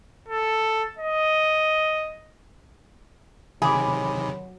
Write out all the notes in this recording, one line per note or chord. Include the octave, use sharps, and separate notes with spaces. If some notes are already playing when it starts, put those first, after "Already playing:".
A4
D#5
C3 D#3 F#3 G#4 C#5 B5 D6